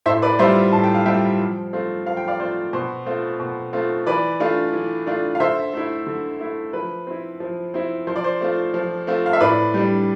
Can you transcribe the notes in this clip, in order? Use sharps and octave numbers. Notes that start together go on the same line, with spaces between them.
A2 C5 E5
B4 D5
G3 C4 F4 C5 E5
A2 A5
G5
F5
G3 C4 F4 E5 G5
F3
A3 C4 F4
F3 F5
G5
D5 F5
A3 C4 F4 C5
B2 C5
A3 C4 F4
B2
A3 C4 F4
E3 B4 D5
A3 D4 F4
E3
A3 D4 F4
F5
D3 C5 E5
A3 E4
D3
A3 E4
F3 B4
C4 E4
F3
C4 E4
F3 C5
D5
C5
A3 C4 F4
F3
A3 C4 F4
F5
E5
A2 B4 D5
G3 D4